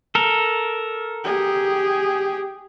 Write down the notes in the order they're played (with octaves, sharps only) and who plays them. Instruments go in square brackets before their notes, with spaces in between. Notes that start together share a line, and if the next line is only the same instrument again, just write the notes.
[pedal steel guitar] A4 A#4
[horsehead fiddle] G4 G#4